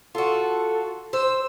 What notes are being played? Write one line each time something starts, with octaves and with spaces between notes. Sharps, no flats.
F4 F#4 A4
C5 E6